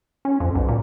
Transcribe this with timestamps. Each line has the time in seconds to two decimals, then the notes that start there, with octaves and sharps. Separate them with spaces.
0.25 C#4
0.40 F2
0.55 B1
0.68 A#2